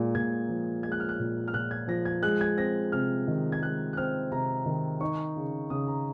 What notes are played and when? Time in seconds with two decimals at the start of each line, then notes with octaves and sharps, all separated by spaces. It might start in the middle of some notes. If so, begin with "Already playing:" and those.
Already playing: A#2 G#3
0.15 A#2 G#6
0.49 F3
0.83 G#3 G#6
0.92 F#6
1.00 F6
1.09 F#6
1.19 A#2
1.48 F6
1.54 A#2 F#6
1.71 G#6
1.88 F3 A#6
2.05 G#6
2.23 G#3 F#6
2.41 G#6
2.57 C4 A#6
2.92 C3 F6
3.28 D#3
3.52 G#6
3.62 G#3 F#6
3.93 F#6
3.97 C4 F6
4.32 C3 A#5
4.66 D#3
5.00 D#4 C#6
5.36 C#3
5.70 C#3 D#6
5.87 A#5